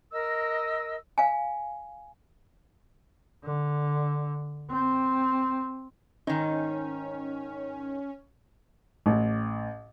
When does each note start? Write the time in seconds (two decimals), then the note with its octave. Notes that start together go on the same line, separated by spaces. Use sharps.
0.11 A#4 D#5 E6
1.18 F5 G#5
3.44 D3
4.70 C4
6.27 G#2 D#3 C#4 D#4
9.06 A1